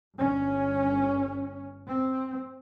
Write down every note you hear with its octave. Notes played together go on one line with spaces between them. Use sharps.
G1 C#4
C4